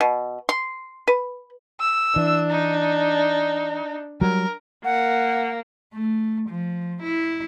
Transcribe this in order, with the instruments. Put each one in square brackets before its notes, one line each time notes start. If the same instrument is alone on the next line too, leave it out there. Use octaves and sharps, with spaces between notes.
[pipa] B2
C6
B4
[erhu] E6
[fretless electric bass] E3 [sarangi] D4
[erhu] D#4
[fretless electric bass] F#3 G3 [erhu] A#4
[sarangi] A#3 [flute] F#5
[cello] A3
F3
E4